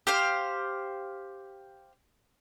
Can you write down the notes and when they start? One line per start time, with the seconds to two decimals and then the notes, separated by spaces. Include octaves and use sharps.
0.07 G4 C5 F5